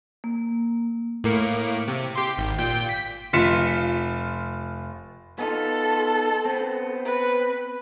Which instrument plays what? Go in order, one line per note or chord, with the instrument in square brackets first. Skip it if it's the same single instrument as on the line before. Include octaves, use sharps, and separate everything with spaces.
[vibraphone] A#3
[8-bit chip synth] A2 A#3 C#7
C3
G4 C6
G#1
A#2 G5 G6
B6
[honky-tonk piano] F1 F4 B6 C#7 E7
[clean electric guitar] B3 D#4 F4 [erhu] A4
[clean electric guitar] B3 C4
[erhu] B4